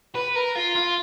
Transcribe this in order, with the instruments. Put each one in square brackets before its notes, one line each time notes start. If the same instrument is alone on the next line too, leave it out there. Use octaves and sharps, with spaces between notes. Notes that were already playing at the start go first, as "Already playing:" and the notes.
[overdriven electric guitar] B4
A#4
F4
F4